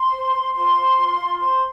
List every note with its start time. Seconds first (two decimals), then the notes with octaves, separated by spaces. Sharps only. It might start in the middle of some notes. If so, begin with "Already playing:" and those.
Already playing: C6
0.11 C5
0.32 C5
0.53 F4 C6
0.75 C5
0.96 F4
1.17 F4
1.38 C5 C6